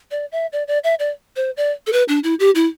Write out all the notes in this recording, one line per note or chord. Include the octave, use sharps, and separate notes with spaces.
D5
E5
D5
D5
E5
D5
C5
D5
A4
B4
D4
E4
G4
E4